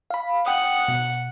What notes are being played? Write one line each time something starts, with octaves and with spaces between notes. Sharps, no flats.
F5 B5
F#5 G5 D#6
B2